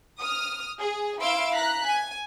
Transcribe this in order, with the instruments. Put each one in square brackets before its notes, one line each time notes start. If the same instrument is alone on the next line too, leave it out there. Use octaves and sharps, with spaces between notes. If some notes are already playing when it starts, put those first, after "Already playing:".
[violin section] D#6 F6
G#4
E4 F5 C6 E6 D7
A#5 F#6 B6
G#5